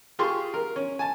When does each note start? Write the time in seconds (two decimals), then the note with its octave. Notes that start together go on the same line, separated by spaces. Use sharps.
0.19 F4 G4 G#4 C6 C#6
0.54 A#4
0.76 C#4
0.99 G#5 A5